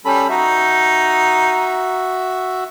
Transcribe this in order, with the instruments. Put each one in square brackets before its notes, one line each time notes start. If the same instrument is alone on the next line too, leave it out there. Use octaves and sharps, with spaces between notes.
[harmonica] G3 [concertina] C#4 A4 B5
[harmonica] D#4 [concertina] F#4 E5